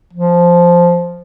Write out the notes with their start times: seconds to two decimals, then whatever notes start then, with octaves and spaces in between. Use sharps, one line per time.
0.13 F3